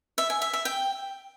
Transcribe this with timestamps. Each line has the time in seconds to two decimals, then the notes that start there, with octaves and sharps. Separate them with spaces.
0.18 E5
0.30 G#5
0.42 E5
0.53 E5
0.65 G5